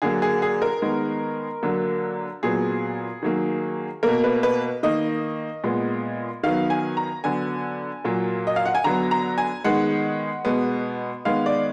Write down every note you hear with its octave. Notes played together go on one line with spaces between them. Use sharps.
D3 F#3 A#3 G#4
G#4
G#4
A#4
D#3 G#3 B3
D3 F#3 A#3
A#2 F#3 B3 G#4
D#3 F#3 A#3
B2 A#3 A#4
B4
B4
D#3 A#3 D#5
A#2 G#3 B3
D#3 F#3 B3 F5
G#5
A#5
D3 F#3 B3 G#5
A#2 F#3 A#3
D#5
F5
F#5
G#5
D3 F#3 B3 A#5
A#5
G#5
D#3 G#3 B3 F#5
B2 G#3 B3
D#3 G#3 B3 F5
D5